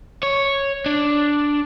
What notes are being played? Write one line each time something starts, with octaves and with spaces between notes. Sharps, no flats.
C#5
D4